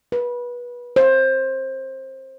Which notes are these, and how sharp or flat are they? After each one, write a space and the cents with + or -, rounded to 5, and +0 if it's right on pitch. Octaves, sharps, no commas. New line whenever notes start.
B4 -25
C5 +20